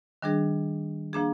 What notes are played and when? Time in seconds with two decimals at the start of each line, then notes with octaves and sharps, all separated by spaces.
0.22 D#3 G3 D4 G#4
1.13 F3 A#3 D4 G#4